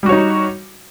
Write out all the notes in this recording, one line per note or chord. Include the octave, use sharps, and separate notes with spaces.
G3 D#4 F#4 C#5